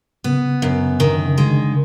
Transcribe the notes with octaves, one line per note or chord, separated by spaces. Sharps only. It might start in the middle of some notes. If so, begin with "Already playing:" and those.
C#3 B3
F#2
D3 D#3
C#3
G#3
D3